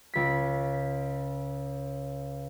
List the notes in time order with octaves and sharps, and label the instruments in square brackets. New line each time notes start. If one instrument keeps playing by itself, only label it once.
[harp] C#2 B6